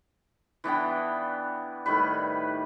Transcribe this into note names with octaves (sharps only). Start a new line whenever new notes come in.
E3 B3 D4 G5
A2 D#3 G3 B4